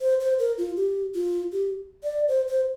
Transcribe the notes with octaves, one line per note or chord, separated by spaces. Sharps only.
C5
C5
A#4
F4
G4
F4
G4
D5
C5
C5